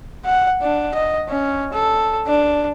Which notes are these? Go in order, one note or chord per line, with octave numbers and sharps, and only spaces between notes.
F#5
D4
D#5
C#4
A4
D4